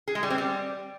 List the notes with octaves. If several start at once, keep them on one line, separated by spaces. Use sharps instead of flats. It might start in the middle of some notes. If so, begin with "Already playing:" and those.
G#4
G#3
G3
C4
G3